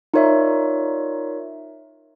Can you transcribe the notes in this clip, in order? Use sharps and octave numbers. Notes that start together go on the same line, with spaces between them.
D#4 F4 A#4 C#5 D5 E5